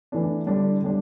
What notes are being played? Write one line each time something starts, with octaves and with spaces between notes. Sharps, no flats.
E3 A3 D4
D3 G3 D4
D3 G3 D4